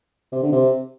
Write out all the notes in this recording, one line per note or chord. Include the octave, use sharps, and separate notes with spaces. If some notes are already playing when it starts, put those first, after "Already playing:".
C3
D3
C3